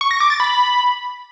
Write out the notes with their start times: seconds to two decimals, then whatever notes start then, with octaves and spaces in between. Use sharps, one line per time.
0.01 C#6
0.11 A#6
0.20 D6
0.30 A6
0.40 B5